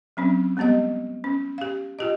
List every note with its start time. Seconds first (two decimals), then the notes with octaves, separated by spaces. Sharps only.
0.17 F#3 C4 C#4
0.57 G3 G#3 B3 G4 D#5
1.24 C#4
1.58 G4 F5
1.99 F4 G4 D#5